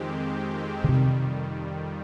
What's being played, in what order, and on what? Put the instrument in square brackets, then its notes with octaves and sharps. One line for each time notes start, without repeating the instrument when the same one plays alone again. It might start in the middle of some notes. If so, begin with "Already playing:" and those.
Already playing: [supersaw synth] F2 D#3 G#3 C4 G4
[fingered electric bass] C#3
[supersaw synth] F2 D#3 G3 [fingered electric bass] C3